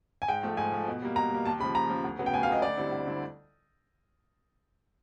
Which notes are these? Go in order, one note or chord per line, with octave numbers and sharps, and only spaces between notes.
G#5
G#2 G5
F3 A3
G#2 G#5
F3 A3
B2
G3 A#3
B2 A#5
G3 A#3
D#2 A5
C#3 F3 B5
D#2 A#5
C#3 F3
D2
C#3 F#3 B3
G5
D2 G#5
F5
C#3 F#3 B3 D#5
D2 D5
D3 G3 C4 E4
D2
D3 G3 C4 E4